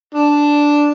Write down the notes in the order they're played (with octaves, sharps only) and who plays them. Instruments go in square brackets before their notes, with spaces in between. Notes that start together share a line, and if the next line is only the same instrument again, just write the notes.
[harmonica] D4